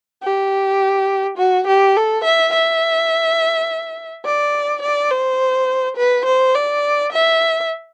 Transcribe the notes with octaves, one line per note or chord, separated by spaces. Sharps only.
G4
F#4
G4
A4
E5
E5
D5
D5
C5
B4
C5
D5
E5